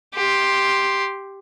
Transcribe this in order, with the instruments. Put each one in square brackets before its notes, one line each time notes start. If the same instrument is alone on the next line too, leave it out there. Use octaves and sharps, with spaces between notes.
[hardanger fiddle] G4 C6